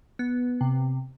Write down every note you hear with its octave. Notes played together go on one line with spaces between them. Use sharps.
B3
C3